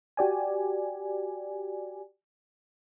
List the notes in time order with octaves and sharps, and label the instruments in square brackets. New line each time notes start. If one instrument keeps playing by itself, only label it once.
[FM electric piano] F#4 G4 D5 G#5